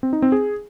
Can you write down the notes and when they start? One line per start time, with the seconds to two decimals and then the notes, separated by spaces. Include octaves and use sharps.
0.03 C4
0.13 D#4
0.22 C4
0.32 G#4